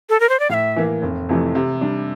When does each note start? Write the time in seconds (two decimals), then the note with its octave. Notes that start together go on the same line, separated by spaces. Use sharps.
0.10 A4
0.20 A#4
0.29 C5
0.40 D5
0.49 A2 F5
0.54 E5
0.76 E3 A#3
1.02 F1
1.29 F2 C3 E3 A3
1.55 C3
1.81 G3 D4